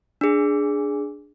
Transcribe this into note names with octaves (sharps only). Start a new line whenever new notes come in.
D4 G#4